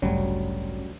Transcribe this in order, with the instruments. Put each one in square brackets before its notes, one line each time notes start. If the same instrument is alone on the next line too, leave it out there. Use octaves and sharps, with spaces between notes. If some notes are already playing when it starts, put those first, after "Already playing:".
[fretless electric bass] A1 G2 C#3 [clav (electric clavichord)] D2 F#3 G3 [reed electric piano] C#4